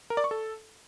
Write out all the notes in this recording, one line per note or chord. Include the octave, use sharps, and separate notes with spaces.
A#4
D5
C#6
A4